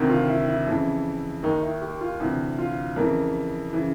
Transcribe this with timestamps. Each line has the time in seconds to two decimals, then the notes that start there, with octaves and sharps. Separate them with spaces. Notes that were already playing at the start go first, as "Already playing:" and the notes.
Already playing: D2 C3 D#3
0.10 F4
0.28 E4
0.48 E4
0.67 F2 C#3 E3
1.43 D#2 D#3 D#4
1.62 E4
1.82 G4
2.01 F4
2.20 D2 C3 E3
2.59 F4
2.96 F2 C#3 E3 A#4
3.73 C#3 E3